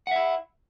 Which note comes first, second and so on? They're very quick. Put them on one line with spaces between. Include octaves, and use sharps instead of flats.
F#5 E5 E4